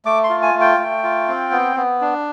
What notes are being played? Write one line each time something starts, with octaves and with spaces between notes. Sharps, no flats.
A3 D6
C6
F4
G#5
A3
G5
A3
F4
C4
B3
B3
D4